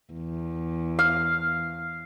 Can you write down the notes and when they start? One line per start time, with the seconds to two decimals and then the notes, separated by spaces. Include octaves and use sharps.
0.12 E2
0.99 F5